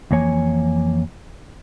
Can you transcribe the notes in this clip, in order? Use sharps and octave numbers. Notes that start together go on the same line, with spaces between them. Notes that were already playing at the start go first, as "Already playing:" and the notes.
F2 E3 A#3 C#5 G#5